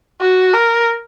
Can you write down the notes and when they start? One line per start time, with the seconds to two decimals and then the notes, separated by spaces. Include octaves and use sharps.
0.21 F#4
0.54 A#4